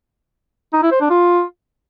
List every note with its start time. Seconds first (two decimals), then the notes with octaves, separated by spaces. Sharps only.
0.73 D#4
0.82 E4
0.91 C5
1.01 D4
1.10 F4